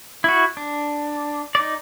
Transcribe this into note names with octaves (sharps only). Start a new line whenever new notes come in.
E4 F#4
D4
D#4 D5